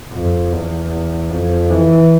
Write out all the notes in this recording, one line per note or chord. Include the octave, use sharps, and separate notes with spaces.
F2
E2
F2
E3